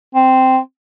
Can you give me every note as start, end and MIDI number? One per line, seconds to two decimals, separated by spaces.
0.15 0.58 60